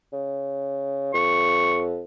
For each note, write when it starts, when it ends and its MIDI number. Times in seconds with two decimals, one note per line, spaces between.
0.13 1.14 49
1.14 2.03 41
1.14 1.81 85